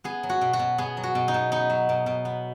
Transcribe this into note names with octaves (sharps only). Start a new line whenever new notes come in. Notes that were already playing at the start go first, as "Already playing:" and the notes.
B3 G#4
F#3
F#4
B2
F#4
B2
B3 G#4
F#3
F#4
B2
D#4
B2
B3 D#4
F#3
B2
B2
B3